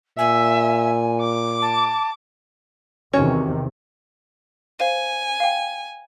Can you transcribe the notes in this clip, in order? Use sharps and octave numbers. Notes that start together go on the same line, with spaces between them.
A#2 E5 G#5
D6
A5
E2 C3 D#3 C#4 F#4 C#5
C5 F5 G#5 D#7
F5 G5